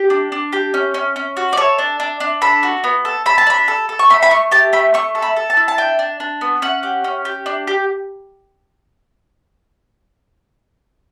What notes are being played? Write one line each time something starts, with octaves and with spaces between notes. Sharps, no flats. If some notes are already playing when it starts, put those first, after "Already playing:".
Already playing: G4
D4
D4
G4
C#4
C#4
C#4
F#4
D5
A4 C#5
D4
D4
D4
A4 B5
F#4
B3
A4
A4 B5
A5
D4 B5
A4
A4
C#6
A3 B5
B5
A3 C#6
G4 A5
A3 B5
A3 C#6
A4
B5
A4
A5
E4
A5
D4 G5
D4
D4
B3
C#4 F#5
G4
C#4
G4
D4
G4